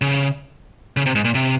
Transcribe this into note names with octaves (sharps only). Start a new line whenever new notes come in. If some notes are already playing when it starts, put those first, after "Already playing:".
C#3
C#3
C3
G#2
A#2
C3